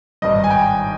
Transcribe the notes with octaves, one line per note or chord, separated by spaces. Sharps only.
G#1 G2 D#3 G3 D#5
G#5
G5